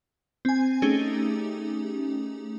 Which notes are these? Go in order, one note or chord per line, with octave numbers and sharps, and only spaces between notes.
C4 G#5
A3 C#4 D#4 G4 G#4